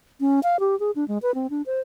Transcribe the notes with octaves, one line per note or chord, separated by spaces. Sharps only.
C#4
F5
G4
G#4
D4
G#3
B4
C4
D4
C5